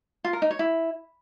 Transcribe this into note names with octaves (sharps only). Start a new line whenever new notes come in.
F4
A#4
D#4
C#5
E4